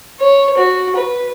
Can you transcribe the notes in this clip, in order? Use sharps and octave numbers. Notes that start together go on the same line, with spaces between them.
C#5
F#4
B4